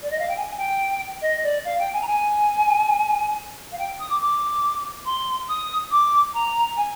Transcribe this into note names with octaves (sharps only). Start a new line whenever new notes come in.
D5
D#5
F5
G5
G#5
G5
D#5
D5
F5
G5
G#5
A#5
G#5
F5
G5
D#6
D6
D6
C6
D#6
D6
A#5
G#5